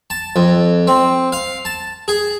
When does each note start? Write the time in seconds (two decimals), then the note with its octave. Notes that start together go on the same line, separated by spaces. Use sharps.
0.10 A5
0.36 F2
0.87 C4
1.32 F5
1.65 A5
2.08 G#4